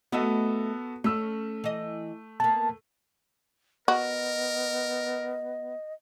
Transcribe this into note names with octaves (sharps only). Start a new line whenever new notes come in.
A3 B3 F#4 A4 D#5 E5
A3 C#4 E6
E3 D#5
A#3 B3 A5
B3 F#4 A#4 D#5